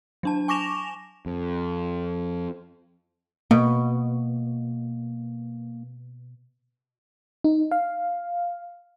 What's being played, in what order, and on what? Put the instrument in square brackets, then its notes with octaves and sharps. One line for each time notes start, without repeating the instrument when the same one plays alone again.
[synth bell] F#3 D4 A5
G#5 C#6 D6 A#6 E7 F7
[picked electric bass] F2
[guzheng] B2 [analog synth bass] A#3
[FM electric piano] D#4
F5